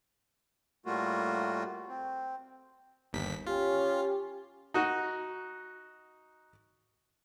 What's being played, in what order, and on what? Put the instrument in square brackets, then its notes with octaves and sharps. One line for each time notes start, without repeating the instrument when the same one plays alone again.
[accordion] A2 G3 A3 A#3 F4 F#4
C4
[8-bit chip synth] G1 D#2 B6
[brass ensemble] C#4 G4 [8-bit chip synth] F4
[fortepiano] D#4 F#4